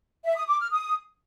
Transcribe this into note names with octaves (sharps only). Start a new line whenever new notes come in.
E5
D#6
D6
F6
D#6